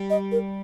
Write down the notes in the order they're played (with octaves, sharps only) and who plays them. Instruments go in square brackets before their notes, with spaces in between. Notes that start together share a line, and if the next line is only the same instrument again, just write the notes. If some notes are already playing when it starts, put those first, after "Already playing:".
Already playing: [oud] G3
[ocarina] D#5
A#4